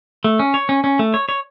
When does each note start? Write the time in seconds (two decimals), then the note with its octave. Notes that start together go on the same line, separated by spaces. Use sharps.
0.24 A3
0.39 C#4
0.54 C#5
0.69 C#4
0.84 C#4
0.99 A3
1.14 C#5
1.29 C#5